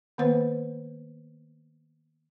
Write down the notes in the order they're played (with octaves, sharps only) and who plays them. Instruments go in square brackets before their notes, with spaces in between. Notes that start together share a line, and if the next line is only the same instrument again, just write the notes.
[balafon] D#3 A#3 B3 B4 C5